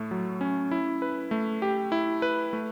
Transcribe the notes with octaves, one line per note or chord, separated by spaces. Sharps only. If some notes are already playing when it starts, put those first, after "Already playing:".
Already playing: A2 A3
F#3
C#4
E4
B4
A3
G4
E4
B4
A3